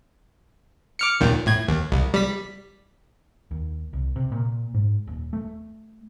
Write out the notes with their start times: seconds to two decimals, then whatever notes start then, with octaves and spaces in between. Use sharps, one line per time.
0.99 D6 F6 C#7
1.20 D#2 A#2 D#3
1.46 A2 G#6
1.68 D#2
1.92 C2
2.14 G3 B6
3.51 D#2
3.93 C2
4.16 C3
4.32 A#2
4.74 G#2
5.07 D#1
5.33 A3